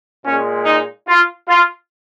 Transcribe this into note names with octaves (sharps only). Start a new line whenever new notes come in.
A#2 G#3 C#4
D#4
F4
F4